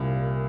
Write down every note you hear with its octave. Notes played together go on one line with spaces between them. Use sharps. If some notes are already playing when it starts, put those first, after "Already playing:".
Already playing: C2 A#2